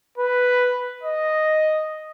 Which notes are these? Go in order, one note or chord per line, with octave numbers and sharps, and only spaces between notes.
B4
D#5